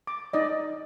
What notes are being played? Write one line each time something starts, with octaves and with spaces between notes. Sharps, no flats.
D6
D#4 D5 D#5